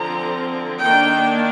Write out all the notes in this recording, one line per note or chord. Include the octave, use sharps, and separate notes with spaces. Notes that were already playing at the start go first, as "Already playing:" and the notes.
Already playing: D3 F3 C4 A#5
D#3 A#3 D4 G5